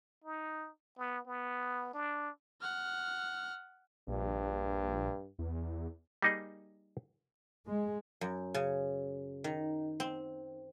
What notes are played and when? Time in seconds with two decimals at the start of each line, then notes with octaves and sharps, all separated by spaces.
0.24 D#4
0.98 B3
1.27 B3
1.94 D4
2.61 F#5 F6
4.08 A#1 G2
5.39 E2
6.22 G3 A#3 D#4 G#4 D#5
7.66 G#3
8.21 F#2
8.54 C#3
9.44 D#3
10.00 C4